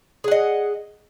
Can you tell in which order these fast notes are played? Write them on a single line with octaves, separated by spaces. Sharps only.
G#4 F#5 D#5